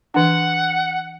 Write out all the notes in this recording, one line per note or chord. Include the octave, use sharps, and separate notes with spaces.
E3 D4 F#5